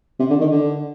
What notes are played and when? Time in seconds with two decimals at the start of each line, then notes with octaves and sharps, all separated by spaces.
0.19 C3
0.30 D3
0.40 D#3
0.52 D3